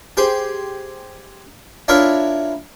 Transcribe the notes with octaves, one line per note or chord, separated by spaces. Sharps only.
G4 G#4 C5
D4 E4 F4 A#4 C#5 E5